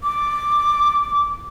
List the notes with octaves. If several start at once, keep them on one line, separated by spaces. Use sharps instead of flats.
D6